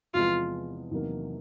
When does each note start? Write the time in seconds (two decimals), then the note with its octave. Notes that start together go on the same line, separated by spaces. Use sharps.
0.14 E2 C3 F3 G#3 B3 F4
0.91 E2 C3 D#3 F#3 A#3